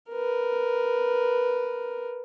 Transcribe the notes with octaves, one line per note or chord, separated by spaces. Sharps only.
A#4 B4